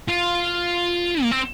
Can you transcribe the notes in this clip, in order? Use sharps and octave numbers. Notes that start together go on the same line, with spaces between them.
F4
A#3
C4